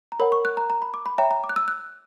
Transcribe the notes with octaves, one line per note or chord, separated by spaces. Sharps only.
A#5
A#4 C#5 F#5 B5
C#6
F#6
A#5
A#5
B5
D6
B5
C#5 E5 G5 A#5
A#5
D6
F#6
E6
F#6